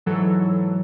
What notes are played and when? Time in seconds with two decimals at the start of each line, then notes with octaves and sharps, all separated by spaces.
0.06 G#2 E3 F#3 A4